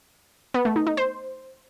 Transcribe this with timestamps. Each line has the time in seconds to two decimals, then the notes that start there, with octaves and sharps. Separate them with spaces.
0.54 B3
0.65 A3
0.76 D#4
0.87 D#4
0.97 C5